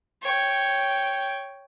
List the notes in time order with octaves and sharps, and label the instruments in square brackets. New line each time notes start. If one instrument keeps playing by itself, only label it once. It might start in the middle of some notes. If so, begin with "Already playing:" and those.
[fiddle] C#5 G5